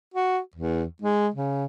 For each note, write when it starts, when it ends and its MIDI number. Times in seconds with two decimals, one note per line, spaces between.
0.14 0.40 66
0.56 0.85 40
1.02 1.29 56
1.34 1.66 49